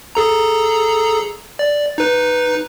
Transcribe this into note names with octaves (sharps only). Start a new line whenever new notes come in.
G#4 A4 A#5
D5
D#4 B4